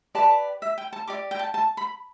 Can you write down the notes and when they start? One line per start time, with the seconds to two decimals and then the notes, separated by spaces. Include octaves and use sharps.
0.15 G4 B4 D5 A5
0.62 E5
0.78 G5
0.93 A5
1.07 G4 D5 D6
1.31 G5
1.39 A5
1.54 A5
1.77 B5